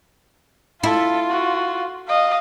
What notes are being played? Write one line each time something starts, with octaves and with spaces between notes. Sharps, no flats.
E4 F4 A4
F#4
D#5 F5